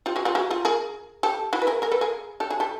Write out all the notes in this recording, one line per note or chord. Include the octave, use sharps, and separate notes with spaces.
F4 G4
F#4 G#4
F4 G4
F#4 G#4
F4 G4
G#4 A#4
G4 A4
E4 F#4
B4
G#4 A#4
G#4 A#4
A4 B4
G#4 A#4
G4 A4
F#4 G#4
G4 A4